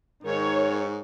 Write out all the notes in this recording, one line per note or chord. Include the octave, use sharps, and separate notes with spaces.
G#2 D#3 C#5